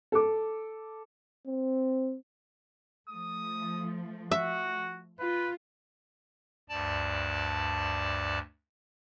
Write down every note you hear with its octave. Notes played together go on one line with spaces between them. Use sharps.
A4 D6
C4
F3 A3 D#6
F#4 E5
F4 B4
D2 G2 D5 A5